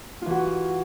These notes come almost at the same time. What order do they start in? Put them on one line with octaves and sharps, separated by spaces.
F4 E3 F#4